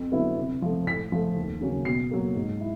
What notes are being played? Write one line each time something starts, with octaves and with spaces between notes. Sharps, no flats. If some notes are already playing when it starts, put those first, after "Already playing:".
Already playing: F2
D3 F#3 B3 E4
C3
F3 A3
A2 B6
F3 A3
D#2
C#3 F#3 A#3 C#4
B2 C7
F#3 A#3
G#2
E4